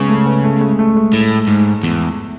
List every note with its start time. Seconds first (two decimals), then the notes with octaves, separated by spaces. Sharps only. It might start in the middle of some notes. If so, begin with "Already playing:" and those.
Already playing: C#3 G#3 B3
0.09 A3
0.26 B3
0.44 A3
0.61 G#3
0.79 A3
0.96 G#3
1.13 A2
1.48 G#2
1.83 E2